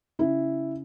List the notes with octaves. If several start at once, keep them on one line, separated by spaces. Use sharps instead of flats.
C#3 E4